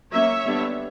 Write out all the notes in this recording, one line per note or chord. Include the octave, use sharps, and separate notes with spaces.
F#3 A#3 C#4 C#5 E5
D3 G3 B3 D4